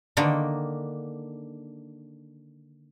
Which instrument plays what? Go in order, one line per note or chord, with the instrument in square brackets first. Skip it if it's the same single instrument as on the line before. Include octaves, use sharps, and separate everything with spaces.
[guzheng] D3 D#3 A#3 D4